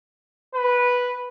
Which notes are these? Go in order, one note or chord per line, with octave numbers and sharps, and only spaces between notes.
B4